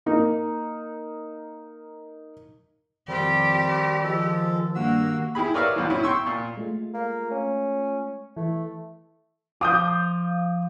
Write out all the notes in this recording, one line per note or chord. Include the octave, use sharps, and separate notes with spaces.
A#3 D#4
F2 D#3 G3 C4 G4
F3 G#3 A4
G2 A#3 F#4 E6
E4 G4 G#4 B5
A#4 B4 C#5 D5 E5 F5
C#2 F#2 A#2 E3
C#4 E4
G5 C6 C#6 E6
A#2
G#3 A3 F4
A#3
C#4
E3 A3
F3 F4 D6 D#6 G6